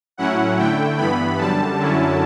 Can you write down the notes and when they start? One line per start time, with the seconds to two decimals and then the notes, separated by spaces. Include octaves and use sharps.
0.17 A2 F#3 C#4 E4 F#5
0.58 D3 A3 E4 G5
0.97 G2 E3 B3 B5
1.38 F#2 D3 G3 A5
1.78 F#2 D3 F#3 C#4 E4